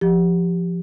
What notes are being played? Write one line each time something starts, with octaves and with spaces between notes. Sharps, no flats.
F3 G4